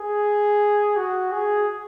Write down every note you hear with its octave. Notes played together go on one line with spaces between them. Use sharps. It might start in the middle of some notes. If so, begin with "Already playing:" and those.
Already playing: G#4
F#4
G#4